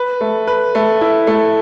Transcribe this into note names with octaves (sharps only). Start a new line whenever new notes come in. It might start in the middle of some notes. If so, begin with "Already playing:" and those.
Already playing: B4
A3
B4
A3
E4
A3